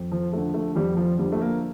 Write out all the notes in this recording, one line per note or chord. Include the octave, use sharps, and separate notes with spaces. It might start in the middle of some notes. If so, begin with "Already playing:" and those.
Already playing: F2
F3
D3 F3 A3
A3
F2 G3
F3
D3 F3 G3
A3
A#3